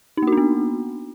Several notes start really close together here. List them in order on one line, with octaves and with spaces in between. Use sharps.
D#4 A#3 F#4 D4 B3